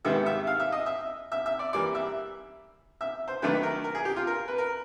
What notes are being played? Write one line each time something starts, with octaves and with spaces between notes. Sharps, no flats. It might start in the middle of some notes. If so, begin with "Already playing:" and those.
G#2 D#3 G3 B3 E5
E5
F5
E5
D#5
E5
E5
E5
D5
E3 G3 A#3 D5
E5
E5
C5
D#3 F#3 A3 D4 B4
A#4
A#4
G#4
G4
F4
A#4
B4
A#4